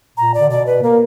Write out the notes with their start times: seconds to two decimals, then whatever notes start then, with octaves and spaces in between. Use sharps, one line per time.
0.17 A#2 A#5
0.34 D5
0.40 D3
0.50 B2 D5
0.66 B4
0.83 A#3 A#4